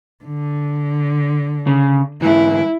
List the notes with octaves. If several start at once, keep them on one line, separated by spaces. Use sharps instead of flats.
D3
C#3
G#2 E3 E4